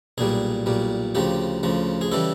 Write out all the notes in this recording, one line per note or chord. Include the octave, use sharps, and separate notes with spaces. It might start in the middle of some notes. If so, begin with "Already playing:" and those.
B1 A#2 G3 G#4
B1 A#2 G3
D2 C#3 F3 G4
D2 C#3 F3
G#4
C#3 E3 G3 A4